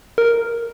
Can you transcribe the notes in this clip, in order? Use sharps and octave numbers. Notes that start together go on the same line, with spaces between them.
A#4